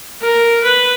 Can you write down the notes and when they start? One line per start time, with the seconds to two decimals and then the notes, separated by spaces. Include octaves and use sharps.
0.22 A#4
0.64 B4